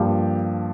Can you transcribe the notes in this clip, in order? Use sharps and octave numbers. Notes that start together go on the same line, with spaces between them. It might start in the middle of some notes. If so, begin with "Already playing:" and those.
Already playing: G2 F3 A#3 G4